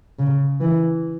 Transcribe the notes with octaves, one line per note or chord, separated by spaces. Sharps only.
C#3
E3